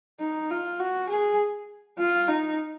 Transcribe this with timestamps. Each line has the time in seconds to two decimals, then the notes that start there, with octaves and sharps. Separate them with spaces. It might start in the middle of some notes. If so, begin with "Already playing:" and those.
0.20 D#4
0.50 F4
0.79 F#4
1.09 G#4
1.99 F4
2.28 D#4